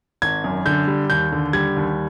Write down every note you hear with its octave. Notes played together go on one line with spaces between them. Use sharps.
G#1 G#6
F#2
D3 G6
G3
D#2 G6
D3
G3 G#6
D#2